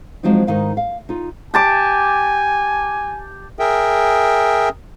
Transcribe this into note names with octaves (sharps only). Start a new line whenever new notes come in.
F3 F#3 G#3 C4 D#4
G#2 D#3 D#4 F5
F5
D#4 F4
G4 G#5 A5 D6
G#4 A#4 E5 G5